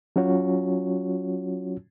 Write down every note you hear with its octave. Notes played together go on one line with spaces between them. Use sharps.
F#3 C#4 F4 F#4 C#5